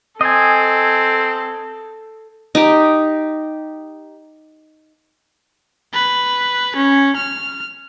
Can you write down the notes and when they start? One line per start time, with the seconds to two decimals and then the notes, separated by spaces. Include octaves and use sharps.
0.21 C4 A4 D#5 G#5
2.55 D#4 G4
5.94 B4
6.76 C#4
7.17 F6